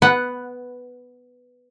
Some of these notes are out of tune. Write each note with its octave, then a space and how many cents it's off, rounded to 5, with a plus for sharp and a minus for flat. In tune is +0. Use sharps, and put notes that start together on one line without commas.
B3 +5 B4 +0 F#5 +0